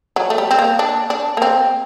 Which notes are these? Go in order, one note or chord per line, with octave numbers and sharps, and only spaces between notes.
F#3
A3
G3
C4
A#3
D4
D4
A#3
C4